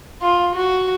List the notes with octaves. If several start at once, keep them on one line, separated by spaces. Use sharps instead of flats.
F4
F#4